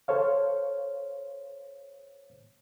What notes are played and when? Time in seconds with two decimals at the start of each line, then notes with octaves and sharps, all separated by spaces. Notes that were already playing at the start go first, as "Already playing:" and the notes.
0.08 A4 C5 C#5 F5